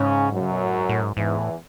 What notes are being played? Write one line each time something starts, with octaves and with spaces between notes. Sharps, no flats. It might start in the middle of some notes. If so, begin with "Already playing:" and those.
Already playing: G#2 C#3 C#4
F#2 F#3
C#3
B2
A2
G#2
A2
G#2
E2 G#2 E3
A2